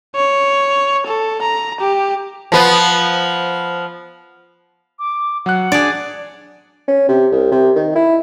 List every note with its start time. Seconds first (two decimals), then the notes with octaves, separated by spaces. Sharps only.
0.15 C#5
1.07 A4
1.42 A#5
1.80 G4
2.52 F3 B3
4.99 D6
5.46 F#3 F#5 F#6
5.72 D4 G#4 D5
6.88 C#4
7.09 C3
7.32 C2
7.52 C3
7.76 D#3
7.96 E4